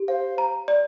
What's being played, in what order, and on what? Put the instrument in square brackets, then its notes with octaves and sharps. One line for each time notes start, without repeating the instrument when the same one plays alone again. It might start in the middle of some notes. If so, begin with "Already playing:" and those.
Already playing: [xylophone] G4
[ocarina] C5 [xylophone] F5
[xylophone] A#5
D5